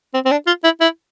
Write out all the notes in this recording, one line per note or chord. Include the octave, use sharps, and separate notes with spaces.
C4
C4
D4
F4
E4
E4